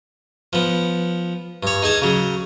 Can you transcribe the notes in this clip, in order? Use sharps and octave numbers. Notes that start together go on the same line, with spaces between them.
F3 B3
G2 C#5
D#4 G#4 G#5 A5
C#3 F#3